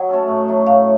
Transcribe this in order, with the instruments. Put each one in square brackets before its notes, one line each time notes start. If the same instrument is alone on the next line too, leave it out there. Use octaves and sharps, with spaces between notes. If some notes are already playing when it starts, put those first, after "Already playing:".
Already playing: [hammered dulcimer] F#3 D#4 [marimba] F#5
[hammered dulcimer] A3 C#4 A4
A2
F#3 A3
[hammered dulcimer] A2 [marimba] F5